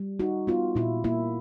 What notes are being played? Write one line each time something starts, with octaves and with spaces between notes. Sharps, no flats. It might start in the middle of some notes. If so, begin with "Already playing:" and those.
Already playing: G3
D#4 F#4
B3 F4
A#2 E4
A#3 E4